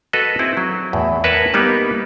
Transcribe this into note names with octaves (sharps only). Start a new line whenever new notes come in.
F#4 A4 B4 D#5
C4 E4 G#4
F#3
E2 A2
A#4 B4 C#5 E5 A5
G3 A#3 B3 D#4 G4